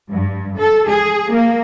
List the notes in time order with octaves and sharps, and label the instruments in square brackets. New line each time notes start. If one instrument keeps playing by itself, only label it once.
[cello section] G2
A4
G#4
A#3